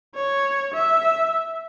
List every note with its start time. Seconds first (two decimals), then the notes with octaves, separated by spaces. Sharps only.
0.15 C#5
0.74 E5